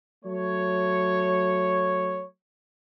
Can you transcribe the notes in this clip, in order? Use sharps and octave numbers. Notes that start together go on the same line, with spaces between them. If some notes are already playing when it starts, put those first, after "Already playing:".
F#3 A3 C#5